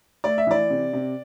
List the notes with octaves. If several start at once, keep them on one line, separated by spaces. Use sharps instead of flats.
A3 D5
E5
E3 D5
C3
C3